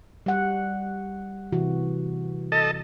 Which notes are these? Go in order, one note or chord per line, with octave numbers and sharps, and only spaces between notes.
G3 F#5
C3 E3 F#4
A4 D#5 A5